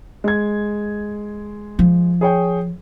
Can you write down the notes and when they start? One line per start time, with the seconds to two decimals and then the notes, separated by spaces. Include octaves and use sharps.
0.24 G#3 G#6
1.79 F3
2.21 G#4 C#5 G5